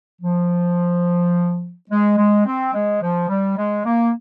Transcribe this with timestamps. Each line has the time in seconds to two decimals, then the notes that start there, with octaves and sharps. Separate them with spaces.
0.21 F3
1.90 G#3
2.18 G#3
2.46 C4
2.74 G#3
3.02 F3
3.29 G3
3.57 G#3
3.85 A#3